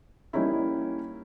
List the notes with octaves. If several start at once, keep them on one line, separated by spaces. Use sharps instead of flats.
G3 A#3 C#4 D#4 E4